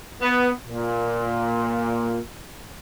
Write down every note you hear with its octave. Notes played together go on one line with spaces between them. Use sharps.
B3
A#2